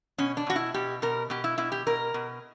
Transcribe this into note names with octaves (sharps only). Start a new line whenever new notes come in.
B2 C#4
D4
B2 F#4
E4
B2 G4
B2 A#4
B2 G4
E4
B2 E4
G4
B2 A#4
B2